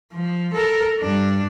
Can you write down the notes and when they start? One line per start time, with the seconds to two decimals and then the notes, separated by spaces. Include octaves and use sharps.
0.13 F3
0.53 A4 A#4
1.00 G2 D4